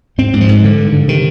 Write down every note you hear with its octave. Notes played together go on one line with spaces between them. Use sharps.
G#2 C4
G#2
F3
G#2
G2 D3
G2
D3
C3 D#3